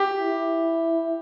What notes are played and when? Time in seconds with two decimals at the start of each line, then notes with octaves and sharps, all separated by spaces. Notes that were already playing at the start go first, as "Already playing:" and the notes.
Already playing: G4
0.19 E4